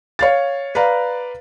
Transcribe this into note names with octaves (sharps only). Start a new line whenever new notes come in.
C#5 F5 A6
B4 D5 F5 A#5